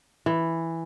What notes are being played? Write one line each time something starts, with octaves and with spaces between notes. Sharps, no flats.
E3